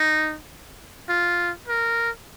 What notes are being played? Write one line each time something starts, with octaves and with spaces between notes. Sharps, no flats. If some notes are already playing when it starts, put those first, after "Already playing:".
Already playing: D#4
F4
A#4